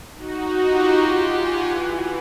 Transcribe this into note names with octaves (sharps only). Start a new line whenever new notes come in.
D#4 F#4
F4 G4
F#5 G#5
E3